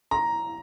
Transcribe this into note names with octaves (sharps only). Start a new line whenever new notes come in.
A#5